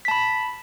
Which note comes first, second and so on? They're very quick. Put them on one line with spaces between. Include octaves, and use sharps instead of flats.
B6 A5 B5